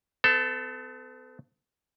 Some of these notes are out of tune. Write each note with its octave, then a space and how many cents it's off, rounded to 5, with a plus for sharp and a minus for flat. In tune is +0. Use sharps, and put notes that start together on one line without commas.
B3 +45 A4 +0